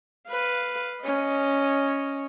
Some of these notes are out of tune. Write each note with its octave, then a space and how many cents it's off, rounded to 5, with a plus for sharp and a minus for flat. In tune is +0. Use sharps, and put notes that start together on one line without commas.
B4 +0 F5 +0
C#4 +0 D#5 +0